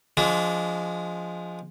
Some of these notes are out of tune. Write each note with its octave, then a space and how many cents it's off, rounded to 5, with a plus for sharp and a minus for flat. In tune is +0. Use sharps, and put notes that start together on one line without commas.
F3 +0 G#3 +0 D4 -35